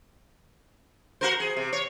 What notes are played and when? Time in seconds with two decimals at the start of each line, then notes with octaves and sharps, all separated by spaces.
1.21 F#4 A#4 C5
1.40 G#4
1.57 C3
1.73 C#5